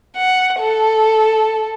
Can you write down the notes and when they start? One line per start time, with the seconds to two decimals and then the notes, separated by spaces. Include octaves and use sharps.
0.17 F#5
0.60 A4